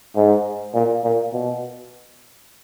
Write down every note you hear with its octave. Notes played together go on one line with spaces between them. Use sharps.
G#2
A#2
A#2
B2